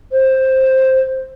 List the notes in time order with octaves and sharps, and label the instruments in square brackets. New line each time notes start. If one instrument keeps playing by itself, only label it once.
[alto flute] C5